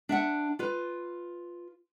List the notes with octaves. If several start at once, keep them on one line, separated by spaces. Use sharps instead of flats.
D4 E5 F#5
F4 B4